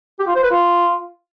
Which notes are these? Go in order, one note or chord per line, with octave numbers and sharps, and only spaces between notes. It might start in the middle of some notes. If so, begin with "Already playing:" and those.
G4
F4
C5
B4
F4